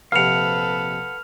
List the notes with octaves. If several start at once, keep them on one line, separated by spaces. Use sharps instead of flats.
A#1 C3 A4 B4 F5 F#5 F6 F7